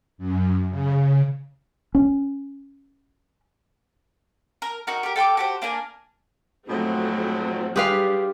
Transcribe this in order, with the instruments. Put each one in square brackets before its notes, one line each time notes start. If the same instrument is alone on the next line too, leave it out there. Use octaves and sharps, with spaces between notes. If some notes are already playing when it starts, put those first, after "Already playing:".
[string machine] F#2
C#3
[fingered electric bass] C#4
[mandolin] A#4
D#4 F#4 A#4
G4 A#4
A4 G5 C6 D6
F#4 G4 C5
A#3 D4 A#4 G#5
[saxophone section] G#2 B2 F#3 [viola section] F3 A3 C4
[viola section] F#3 G3 D4 [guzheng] F4 G4 [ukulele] G#4 B4 F5